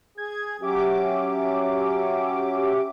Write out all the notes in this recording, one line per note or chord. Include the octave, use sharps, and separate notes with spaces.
G#4 G#6
F#3 C#4 G4 E5 D6